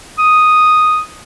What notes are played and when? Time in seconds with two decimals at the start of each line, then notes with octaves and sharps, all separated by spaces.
0.19 D#6